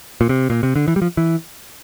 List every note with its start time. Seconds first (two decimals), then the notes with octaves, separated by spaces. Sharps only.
0.21 A#2
0.29 C3
0.50 A#2
0.63 C3
0.76 D3
0.88 E3
0.96 G3
1.02 F3
1.17 E3